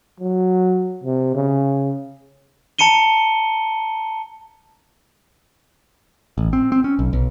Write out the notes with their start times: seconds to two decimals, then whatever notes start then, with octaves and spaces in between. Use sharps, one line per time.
0.20 F#3
1.03 C3
1.35 C#3
2.79 A5 A#5 C#7 D#7 G7
6.38 A1
6.53 C4
6.72 C4
6.84 C#4
6.99 B1
7.13 B1